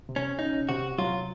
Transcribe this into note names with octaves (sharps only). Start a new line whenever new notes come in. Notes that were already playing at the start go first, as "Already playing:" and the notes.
C3
C#4
C#4 D#4
C3 F#4
F#3 F4